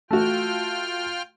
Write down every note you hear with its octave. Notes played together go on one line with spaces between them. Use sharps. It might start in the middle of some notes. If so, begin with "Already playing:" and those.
A3 F4 F#4 G5 F6